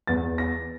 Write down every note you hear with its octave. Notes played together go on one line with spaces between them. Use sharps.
E2 A6
A#6